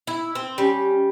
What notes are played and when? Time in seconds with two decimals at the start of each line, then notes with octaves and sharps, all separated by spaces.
0.07 E4
0.35 C4
0.58 G3 C#4